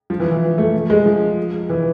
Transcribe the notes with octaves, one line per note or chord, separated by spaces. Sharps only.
F3
E3
E3
A3
G#3
F3
E3